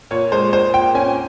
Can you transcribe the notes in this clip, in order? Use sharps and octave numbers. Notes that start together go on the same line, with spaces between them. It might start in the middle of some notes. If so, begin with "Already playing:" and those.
A#2 C#5
G#3 C5
A#2 C5
A#2 G5
C#4 G#5